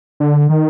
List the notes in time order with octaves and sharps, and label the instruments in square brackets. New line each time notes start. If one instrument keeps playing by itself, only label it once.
[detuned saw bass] D3
D#3